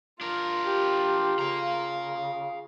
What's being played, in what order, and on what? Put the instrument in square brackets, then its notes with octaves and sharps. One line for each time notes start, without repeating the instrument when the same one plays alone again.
[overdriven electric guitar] D4 A#4 [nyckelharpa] F4
[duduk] G4
[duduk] C#3 [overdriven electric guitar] F5 A#5